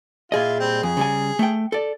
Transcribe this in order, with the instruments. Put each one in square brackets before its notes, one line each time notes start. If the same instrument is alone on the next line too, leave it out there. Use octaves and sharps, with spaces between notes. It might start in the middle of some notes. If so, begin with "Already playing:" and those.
[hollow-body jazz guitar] A#2 G#4 D#5 [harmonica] E4 F4
[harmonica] G3 C4
[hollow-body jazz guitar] F2 [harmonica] G#4
[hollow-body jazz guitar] C#3 G3 G#5
A3 G5
A4 D5